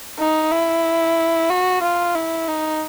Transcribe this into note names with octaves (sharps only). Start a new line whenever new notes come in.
D#4
E4
F#4
F4
E4
D#4